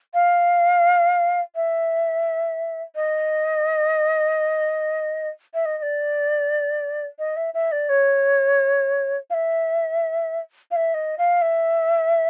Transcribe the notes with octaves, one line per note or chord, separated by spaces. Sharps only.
F5
E5
D#5
E5
D#5
D#5
D5
D#5
E5
E5
D5
C#5
F5
E5
F5
E5
D#5
F5
E5